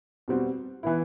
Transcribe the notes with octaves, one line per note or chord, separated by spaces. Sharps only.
B2 G3 C4 F#4
E3 B3 E4